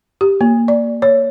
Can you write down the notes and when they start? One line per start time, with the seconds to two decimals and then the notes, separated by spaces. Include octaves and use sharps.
0.21 G4
0.41 A#3
0.68 D5
1.02 C#5